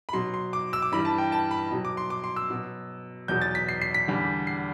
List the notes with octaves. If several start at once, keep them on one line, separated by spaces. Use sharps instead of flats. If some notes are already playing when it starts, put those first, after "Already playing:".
B5
B2 F#3 C6
C6
D6
E6
D6
G2 E3 G3 B5
A5
G5
A5
B5
B2 F#3
D6
C6
D6
C6
E6
B2 F#3
E2 B2 F#3 G6
A6
B6
C7
C7
B6
E2 D3 G3
C7